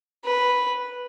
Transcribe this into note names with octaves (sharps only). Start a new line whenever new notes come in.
B4